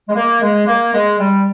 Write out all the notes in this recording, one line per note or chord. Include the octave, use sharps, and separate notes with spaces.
G#3
A#3
G#3
A#3
G#3
G3